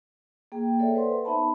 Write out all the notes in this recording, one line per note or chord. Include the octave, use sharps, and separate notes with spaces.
A#3 G#4 G5
A4 C#5 D5 E5
B4 C5 F#5 C6
B3 D#4 E5 A5 B5